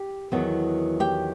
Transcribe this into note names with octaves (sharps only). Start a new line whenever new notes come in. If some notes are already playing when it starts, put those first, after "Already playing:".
Already playing: G4
E2 D#3 F#3 B3
G4 G5